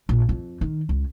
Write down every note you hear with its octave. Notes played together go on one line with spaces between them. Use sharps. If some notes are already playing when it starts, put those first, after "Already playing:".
A#1
F2
D#3
C#2